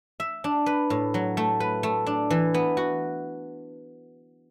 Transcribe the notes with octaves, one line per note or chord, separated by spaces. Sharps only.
E5
D4
B4
A2
F#3
A3
B4
A3
D4
E3
B3
F#4